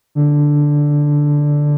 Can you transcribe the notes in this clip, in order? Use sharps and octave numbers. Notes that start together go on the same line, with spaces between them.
D3